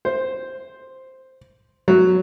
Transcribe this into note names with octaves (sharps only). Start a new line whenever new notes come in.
C5
F#3